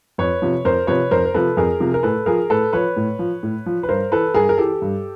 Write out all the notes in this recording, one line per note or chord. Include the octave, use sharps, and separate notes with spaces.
F2 B4 C#5
C3 F3
F2 A#4 C5
C3 F3 B4 C#5
F2 A#4 C5
C5
C3 F3 A4 B4
F2 G#4 A#4
C3 F3
A#4
A2 A4 B4
F3 G#4 A#4
A2 A4 B4
F3 B4 C#5
A2
F3
A2
F3
B4
G2 A#4 C5
E3 A4 B4
G2 G#4 A#4
A#4
E3 G4 A4
G2